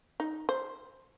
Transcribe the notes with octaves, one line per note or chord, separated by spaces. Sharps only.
D#4
C5